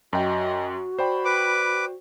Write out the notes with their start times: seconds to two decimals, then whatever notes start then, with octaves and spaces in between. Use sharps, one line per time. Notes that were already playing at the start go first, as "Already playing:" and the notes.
0.13 F#2 F#4 D#5 G5
0.99 C5 D5 G5 B5
1.25 B4 D6